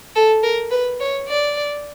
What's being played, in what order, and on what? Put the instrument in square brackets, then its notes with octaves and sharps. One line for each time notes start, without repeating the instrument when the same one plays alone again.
[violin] A4
A#4
B4
C#5
D5